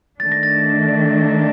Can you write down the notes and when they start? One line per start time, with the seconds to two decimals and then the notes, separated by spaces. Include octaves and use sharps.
0.20 D#3 A3 D4 A6
0.32 A#6
0.43 A6